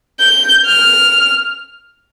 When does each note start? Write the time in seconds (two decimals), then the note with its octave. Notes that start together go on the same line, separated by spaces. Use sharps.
0.20 G6
0.66 F6